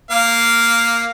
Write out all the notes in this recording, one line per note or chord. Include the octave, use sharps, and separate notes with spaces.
A#3 F5